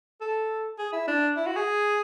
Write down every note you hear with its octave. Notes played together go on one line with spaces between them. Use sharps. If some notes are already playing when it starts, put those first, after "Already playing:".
A4
G#4
E4
D4
E4
F#4
G#4